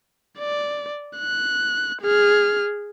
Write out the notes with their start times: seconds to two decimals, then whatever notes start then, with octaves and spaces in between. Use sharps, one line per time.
0.39 D5
1.19 F#6
2.02 G#4 F6